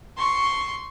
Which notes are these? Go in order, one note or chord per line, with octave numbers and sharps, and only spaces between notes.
C6 C#6